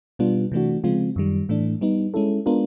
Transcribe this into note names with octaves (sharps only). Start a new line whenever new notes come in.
B2 G3 B3 D4 F4
C3 E3 A3 D4 F#4
C#3 F3 G#3 C4 F4
F#2 D#3 G3
A2 E3 A3 D4
G3 B3 D#4
G#3 C#4 E4 A4
G#3 B3 D4 F4 A#4